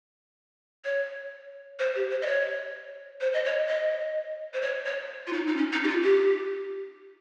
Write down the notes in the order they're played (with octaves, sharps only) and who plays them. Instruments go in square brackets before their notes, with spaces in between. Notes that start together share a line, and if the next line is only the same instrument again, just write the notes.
[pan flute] C#5
C5
G4
C5
D#5
C#5
C5
D#5
C#5
D#5
C5
C#5
C#5
F4
D#4
D#4
C#4
D#4
G4
F4
G4